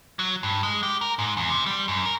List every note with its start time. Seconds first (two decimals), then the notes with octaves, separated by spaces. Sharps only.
0.19 F#3
0.43 G2
0.63 G#3
0.83 G4
1.01 A#4
1.19 G#2
1.37 E2
1.50 C3
1.66 G3
1.88 F#2
2.05 A#4